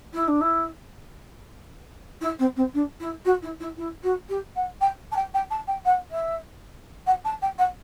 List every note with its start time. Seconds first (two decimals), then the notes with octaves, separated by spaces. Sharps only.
0.13 E4
0.27 D4
0.41 E4
2.21 E4
2.39 C4
2.56 C4
2.74 D4
3.00 E4
3.25 F#4
3.42 E4
3.60 E4
3.77 E4
4.03 F#4
4.29 G4
4.55 F#5
4.81 G5
5.11 A5
5.16 G5
5.34 G5
5.50 A5
5.67 G5
5.85 F#5
6.11 E5
7.06 F#5
7.24 A5
7.42 G5
7.58 F#5